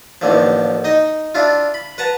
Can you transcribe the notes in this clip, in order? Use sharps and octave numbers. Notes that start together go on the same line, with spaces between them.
A1 D#2 D3 F3
D#4 D#5
D4 E4 F4
B5
B4 F#5 A5 A#5